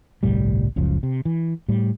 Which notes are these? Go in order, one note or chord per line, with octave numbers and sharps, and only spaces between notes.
G1 C2 A2 G3
F#1 C#2 C#3 F3
C3
E3
A2 G3